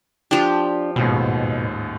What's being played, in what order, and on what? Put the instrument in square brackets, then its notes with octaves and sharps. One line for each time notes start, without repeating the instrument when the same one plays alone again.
[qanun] F3 G4 [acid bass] D4
[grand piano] A1 D#2 G#2 [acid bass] B2